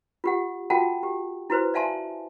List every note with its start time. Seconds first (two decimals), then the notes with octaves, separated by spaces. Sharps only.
0.24 F4 G4 F#5
0.70 F4 F#4 A4 F#5 G5 A5
1.03 G4
1.50 E4 F#4 B4 C5
1.74 D5 E5 F5 G#5 A5 C6